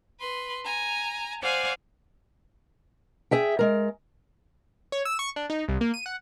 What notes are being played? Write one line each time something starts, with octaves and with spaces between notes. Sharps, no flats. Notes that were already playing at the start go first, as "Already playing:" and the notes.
B4 C6
G#5 A#5
C5 D5 F5 F#5 G#5
G#4 E5 G5
G#3 A#4
C#5
E6
C#6
D4
D#4
C2
A#3
D#7
F#5